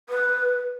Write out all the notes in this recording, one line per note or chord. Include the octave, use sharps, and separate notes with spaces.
B4